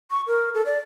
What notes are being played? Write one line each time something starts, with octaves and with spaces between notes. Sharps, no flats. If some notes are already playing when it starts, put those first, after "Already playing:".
C#6
A#4
A4
D5